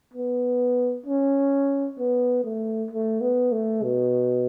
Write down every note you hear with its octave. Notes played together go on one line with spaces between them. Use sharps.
B3
C#4
B3
A3
A3
B3
A3
B2